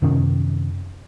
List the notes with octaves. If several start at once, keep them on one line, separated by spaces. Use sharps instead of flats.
F#2 C3 D#3 C#4